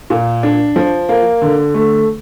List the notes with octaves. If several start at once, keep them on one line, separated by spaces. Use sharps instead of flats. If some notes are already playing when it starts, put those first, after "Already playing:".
A#2
D4
F3
A#3
D3
A3